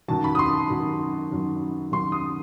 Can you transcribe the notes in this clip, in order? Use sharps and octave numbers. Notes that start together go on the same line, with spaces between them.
F#2 D#3 F#3 A5
B5
D#6
C6
F#2 D#3 F#3
F#2 D#3 F#3
F#2 D#3 F#3 C6
D#6